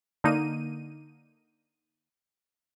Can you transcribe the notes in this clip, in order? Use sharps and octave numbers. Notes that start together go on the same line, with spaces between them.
D3 A#3 D#4 D#7